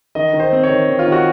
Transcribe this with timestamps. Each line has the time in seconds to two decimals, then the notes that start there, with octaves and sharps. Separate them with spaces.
0.15 D#3 D#5
0.33 D#3
0.40 C5
0.52 C4
0.63 C#5
0.70 D#3
0.89 D#3
0.99 F4
1.07 D#3
1.12 F#4